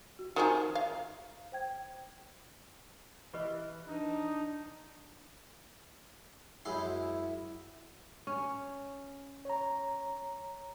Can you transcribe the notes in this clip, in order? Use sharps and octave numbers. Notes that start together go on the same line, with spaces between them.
F#4
D#3 F3 G#4 F#5 G#5 A#5
F5
C5 G5 G#6
E3 G4 B4 D#5
D4 D#4
F#2 G#3 E4 C6
C#4
C#5 A#5